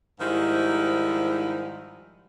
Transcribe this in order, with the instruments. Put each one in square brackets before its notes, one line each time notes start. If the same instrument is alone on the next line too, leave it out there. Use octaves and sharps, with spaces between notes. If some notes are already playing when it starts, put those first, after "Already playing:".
[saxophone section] G#2 D#3 F3 G3 D#4 E4